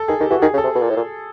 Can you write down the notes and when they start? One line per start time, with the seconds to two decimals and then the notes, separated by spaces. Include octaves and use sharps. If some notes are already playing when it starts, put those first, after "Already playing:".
Already playing: A4
0.08 D#3 G#4
0.20 D#3 G4
0.30 E3 F#4
0.42 D#3 G#4
0.53 C#3
0.58 A4
0.64 C3
0.75 B2
0.82 A#2
0.90 A2
0.96 A#2